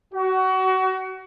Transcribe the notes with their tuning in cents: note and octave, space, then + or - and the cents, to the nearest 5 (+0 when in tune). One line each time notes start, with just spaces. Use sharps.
F#4 +25